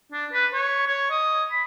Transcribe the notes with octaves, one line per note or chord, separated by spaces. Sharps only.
D4
B4
C#5
C#5
D#5
B5